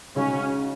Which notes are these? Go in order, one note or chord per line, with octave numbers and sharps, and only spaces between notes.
C#3 G#3 C#4 D#4 F#4